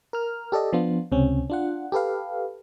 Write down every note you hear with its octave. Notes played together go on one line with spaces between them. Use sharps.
A#4 F6
G4 A4 D5 D#5
F3 B3 D4 F4
C#2 C3 C4 C#4
D4 F4 F#5
G4 A4 B4 F5